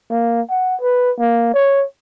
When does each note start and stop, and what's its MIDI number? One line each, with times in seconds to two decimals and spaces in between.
0.11 0.41 58
0.50 0.76 78
0.81 1.12 71
1.19 1.52 58
1.54 1.85 73